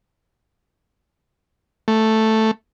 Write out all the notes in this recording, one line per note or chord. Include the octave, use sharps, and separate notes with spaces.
A3